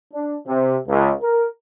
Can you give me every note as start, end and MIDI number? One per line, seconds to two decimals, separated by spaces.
0.13 0.37 62
0.47 0.77 48
0.88 1.13 37
1.22 1.46 70